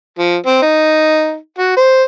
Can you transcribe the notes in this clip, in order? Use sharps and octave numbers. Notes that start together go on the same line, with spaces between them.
F3
C4
D#4
F#4
C5